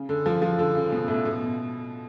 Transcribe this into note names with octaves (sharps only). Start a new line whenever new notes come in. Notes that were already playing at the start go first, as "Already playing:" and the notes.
Already playing: C#3
D3
F3
F3
D3
C#3
B2
A2
B2